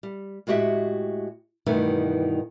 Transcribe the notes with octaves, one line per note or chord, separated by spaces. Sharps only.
G3
A2 G#3 F#4 G4 E5
G2 B2 D#3 E3 A3